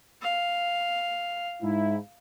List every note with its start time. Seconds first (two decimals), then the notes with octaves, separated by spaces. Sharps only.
0.22 F5
1.62 G#2 E4